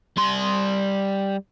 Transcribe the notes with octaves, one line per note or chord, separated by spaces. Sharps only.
G3 C6